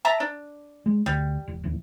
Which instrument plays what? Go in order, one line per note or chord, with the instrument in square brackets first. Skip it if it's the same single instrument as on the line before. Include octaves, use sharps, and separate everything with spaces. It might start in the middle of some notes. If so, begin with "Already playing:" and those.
[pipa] E5 A5 A#5
D4
[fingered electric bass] G#3
[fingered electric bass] D2 [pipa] G3
[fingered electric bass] E1
D1 E2